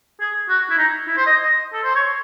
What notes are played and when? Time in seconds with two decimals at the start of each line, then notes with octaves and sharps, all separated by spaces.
0.20 G#4
0.49 F#4
0.70 E4
0.78 D#4
1.07 E4
1.17 C5
1.27 D#5
1.43 D#5
1.73 A4
1.84 C5
1.95 C#5